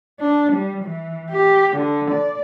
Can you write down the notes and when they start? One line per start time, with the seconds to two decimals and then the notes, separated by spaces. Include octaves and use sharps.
0.20 D4
0.53 G3
0.84 E3
1.31 G4
1.77 D3
2.11 D5